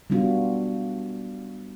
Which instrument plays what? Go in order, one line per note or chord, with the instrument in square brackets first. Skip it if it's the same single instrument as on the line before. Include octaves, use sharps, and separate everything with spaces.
[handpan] G3 B3 D4 F4 F#4